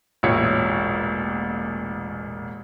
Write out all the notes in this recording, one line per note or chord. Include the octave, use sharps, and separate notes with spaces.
E1 A1 A#2 C#5 C#7